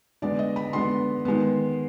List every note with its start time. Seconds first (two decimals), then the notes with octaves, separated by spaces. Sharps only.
0.22 D3 G#3 B3 D5
0.39 D#5
0.56 B5
0.73 D3 G#3 B3 C6
1.25 D#3 G#3 B3